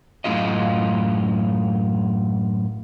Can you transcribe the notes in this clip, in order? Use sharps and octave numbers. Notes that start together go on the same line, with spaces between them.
F#2 A2 G#3 E4 F4 D#5